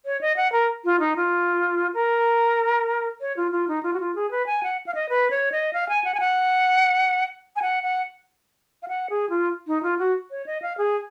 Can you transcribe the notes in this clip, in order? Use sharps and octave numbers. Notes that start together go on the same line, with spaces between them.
C#5
D#5
F#5
A#4
F4
D#4
F4
A#4
C#5
F4
F4
D#4
F4
F#4
F4
G#4
B4
G#5
F#5
F5
D#5
B4
C#5
D#5
F5
G#5
F#5
G#5
F#5
G#5
F#5
F#5
F5
F#5
G#4
F4
D#4
F4
F#4
C#5
D#5
F5
G#4